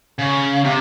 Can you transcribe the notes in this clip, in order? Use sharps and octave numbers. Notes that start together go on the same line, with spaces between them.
C#3
C3